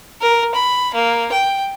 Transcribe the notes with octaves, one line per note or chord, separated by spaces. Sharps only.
A#4
B5
A#3
G5